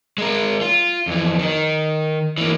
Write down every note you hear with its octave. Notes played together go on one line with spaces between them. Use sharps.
G#3 A#4
F4
F2 E3
D#3
E3 A#3